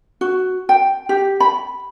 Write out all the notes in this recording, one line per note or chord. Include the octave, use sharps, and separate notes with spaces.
F#4
G5
G4
B5